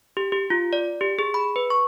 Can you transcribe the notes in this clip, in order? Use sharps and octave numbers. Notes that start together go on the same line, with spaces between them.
G4
G4
F4
D5
G4
G#4
B5
B4
C#6